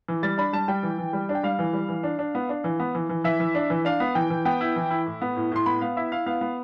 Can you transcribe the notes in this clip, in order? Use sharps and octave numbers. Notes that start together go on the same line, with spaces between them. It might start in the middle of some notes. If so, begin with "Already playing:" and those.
E3
G3 A6
D4 B5
G3 A5
G3 G5
E3
E3
G3
D4
G5
G3 F5
E3
G3
E3
D4
D4
B3
D4
E3
B3
E3
E3
E3 E5
E3
D4
E3
D4 F5
B3
E3 G5
E3
B3 G5
E4
E3
E4
A2
B3
A2
A2 C6
B3 B5
B3 F5
E4 E5
E4 F5
B3 F5
B3